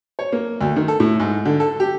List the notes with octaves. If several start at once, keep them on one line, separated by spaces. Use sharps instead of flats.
C#5
A#3
D2
D#3
A4
A2
G#2
D3
A4
G4